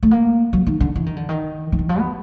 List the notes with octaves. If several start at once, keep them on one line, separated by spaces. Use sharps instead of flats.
A3
A#3
F#3
D#3
D3
E3
D#3
D3
D#3
F3
E3
F3
B3